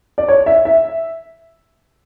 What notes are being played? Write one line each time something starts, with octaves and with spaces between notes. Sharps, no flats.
D5
C#5
E5
E5